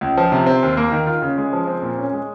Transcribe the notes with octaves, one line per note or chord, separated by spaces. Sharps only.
C#2
F3
C3
C4
D#2
A#3
D#3
F4
C#3
G#3
F3
C4
A#2
C#4
G#3